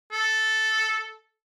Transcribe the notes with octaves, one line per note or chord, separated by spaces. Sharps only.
A4